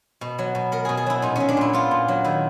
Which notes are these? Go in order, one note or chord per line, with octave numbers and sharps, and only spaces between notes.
B2
F#3
B2
B3 A#4
B2 G#4
G#4
F#3 E4
A#2 D#4
F#3 C#4
D4
A#2 E4
B3 F4
A#2
F#3
D#3 E4